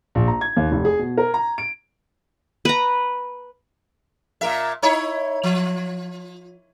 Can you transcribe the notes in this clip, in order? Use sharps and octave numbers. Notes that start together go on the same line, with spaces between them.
A#1
A#5
G#6
D#2
F1
G#4
B2
A#4
A#5
D7
B4 A#5
A#2 A#4 E5
D#4 E4 C#5
F3